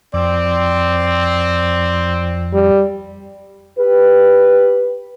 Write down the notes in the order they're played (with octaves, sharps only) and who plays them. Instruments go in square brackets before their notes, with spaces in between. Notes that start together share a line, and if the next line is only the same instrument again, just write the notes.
[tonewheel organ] F2 [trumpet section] C4 [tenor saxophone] D5
[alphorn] G3
[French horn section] G4 B4